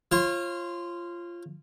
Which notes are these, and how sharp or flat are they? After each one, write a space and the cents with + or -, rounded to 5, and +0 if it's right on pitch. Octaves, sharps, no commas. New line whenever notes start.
F4 -15 C#5 -40